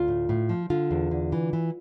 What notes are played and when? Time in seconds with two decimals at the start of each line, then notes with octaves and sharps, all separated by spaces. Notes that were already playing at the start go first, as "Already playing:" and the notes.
Already playing: D2 F4
0.08 A2
0.29 A2
0.49 F3
0.70 D3 F4
0.91 E2
1.11 D3
1.32 E3
1.53 E3